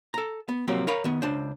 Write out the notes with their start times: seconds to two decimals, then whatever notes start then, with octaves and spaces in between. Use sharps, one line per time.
0.14 A4 A#5
0.49 B3
0.68 C3 F3 F#3 A#3 C4
0.87 A#4 C#5 F5 A#5 B5
1.04 D#3 B3
1.22 C#2 D4 C5